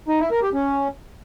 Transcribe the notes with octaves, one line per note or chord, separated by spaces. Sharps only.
D#4
E4
A#4
G4
C#4